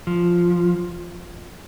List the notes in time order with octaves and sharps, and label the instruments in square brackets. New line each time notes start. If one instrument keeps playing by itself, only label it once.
[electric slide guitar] F3